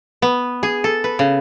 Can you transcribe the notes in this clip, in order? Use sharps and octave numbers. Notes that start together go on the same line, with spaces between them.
B3
G#4
A4
B4
C#3